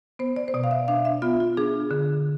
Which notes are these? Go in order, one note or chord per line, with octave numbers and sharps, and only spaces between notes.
B3 C5
D5
C5
B2 D5
F5
E5
D4 F5
E5
B3 F4
F4
D4 G#4
D3